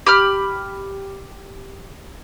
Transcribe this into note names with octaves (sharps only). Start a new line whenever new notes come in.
G4 B5 F6